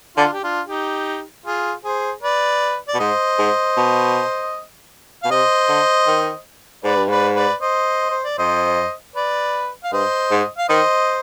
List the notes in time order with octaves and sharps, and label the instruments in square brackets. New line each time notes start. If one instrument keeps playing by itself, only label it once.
[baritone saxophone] D3 [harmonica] D4 F4
[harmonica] G4
D4 F4
D#4 G4
F4 G#4
G#4 C5
B4 D5
D5
[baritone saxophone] B2
[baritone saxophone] G#2 [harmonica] C5 D#5
[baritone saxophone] G#2
B2
[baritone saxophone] B2 [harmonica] F5
[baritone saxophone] C3 [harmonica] C5 D#5
[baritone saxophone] D3
D#3
[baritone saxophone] G#2 [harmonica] B4 D5
[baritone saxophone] G2
[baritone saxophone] G#2 [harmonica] B4 D5
[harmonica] B4 D5
C5 D#5
C5
D5
[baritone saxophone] F2 [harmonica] C5 D#5
[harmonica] B4 D5
F5
[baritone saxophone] G2 [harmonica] C5 D#5
[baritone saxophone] G#2
[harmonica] F5
[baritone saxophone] D#3 [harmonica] C5 D#5